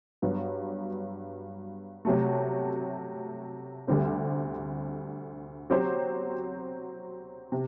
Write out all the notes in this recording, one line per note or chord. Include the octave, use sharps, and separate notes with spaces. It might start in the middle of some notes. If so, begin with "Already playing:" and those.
G2 F#3 B3
C3 F#3 A3
D2 D3 G3 C4 G4
F#3 C4 G4 C5
C3